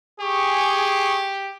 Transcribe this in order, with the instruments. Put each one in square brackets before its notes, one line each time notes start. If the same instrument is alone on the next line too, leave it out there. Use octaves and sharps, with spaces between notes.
[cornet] G4 [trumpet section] G#4 C#6